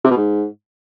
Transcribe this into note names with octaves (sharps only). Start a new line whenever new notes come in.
C3
B2
G#2